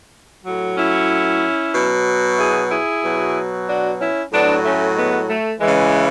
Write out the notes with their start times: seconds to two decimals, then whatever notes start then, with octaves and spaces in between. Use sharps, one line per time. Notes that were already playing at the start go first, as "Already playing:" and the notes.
0.43 A2 F#3
0.76 C#4 E4
1.74 B2 F#3
2.37 E4 G#4
2.69 E4 G#4
3.02 B2 F#3
3.67 D4 F#4
3.99 C#4 E4
4.32 A2 F#3 B3 D4
4.64 A3 C#4
4.96 G#3 B3
5.28 A3
5.60 E3 G#3
5.66 C#3